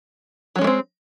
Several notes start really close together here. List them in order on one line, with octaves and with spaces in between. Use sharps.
F#3 C#4 G#3 A3 C4